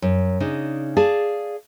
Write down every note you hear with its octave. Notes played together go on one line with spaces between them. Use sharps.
F#2
C#3 D4 D#4
G#4 D5 F5 A5